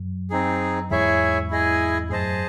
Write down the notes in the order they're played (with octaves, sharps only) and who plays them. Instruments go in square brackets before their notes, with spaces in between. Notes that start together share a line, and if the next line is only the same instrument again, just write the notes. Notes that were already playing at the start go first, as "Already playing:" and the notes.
Already playing: [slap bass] F#2
[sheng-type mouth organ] C4 D#4 G#4
[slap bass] E2 G#2 [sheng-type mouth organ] E4 G#4 C#5 E5 G#5
[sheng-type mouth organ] E4 G#4 D#5 G#5
[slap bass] F#2 A2 [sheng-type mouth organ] G#4 C5 D#5 A5